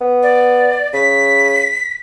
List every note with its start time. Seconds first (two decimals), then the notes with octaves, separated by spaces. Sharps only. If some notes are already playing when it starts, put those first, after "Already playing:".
0.01 B3
0.23 D5
0.93 C#3 B6